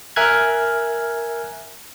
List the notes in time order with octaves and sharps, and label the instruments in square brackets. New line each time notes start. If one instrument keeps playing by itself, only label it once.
[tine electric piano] A#4 E5 G#5 F6 F#6 G#6